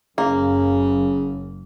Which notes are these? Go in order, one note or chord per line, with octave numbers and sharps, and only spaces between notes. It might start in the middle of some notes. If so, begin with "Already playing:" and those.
F#1 F#2 C#3 A#3